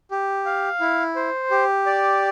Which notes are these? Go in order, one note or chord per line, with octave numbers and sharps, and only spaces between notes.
G4
F5
E4
C5
G4
D5